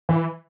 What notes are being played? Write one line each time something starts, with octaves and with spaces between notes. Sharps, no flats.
E3